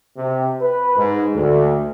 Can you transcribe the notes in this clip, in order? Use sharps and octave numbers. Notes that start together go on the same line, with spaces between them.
C3
B4
G#2
D2